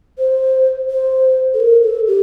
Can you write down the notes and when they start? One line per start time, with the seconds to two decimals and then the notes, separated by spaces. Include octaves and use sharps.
0.18 C5
0.90 C5
1.54 A4
1.60 A#4
1.83 A4
2.07 G4